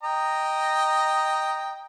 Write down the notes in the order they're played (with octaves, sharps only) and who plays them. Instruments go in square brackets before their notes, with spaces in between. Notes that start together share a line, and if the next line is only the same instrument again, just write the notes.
[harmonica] D#5 G5 A#5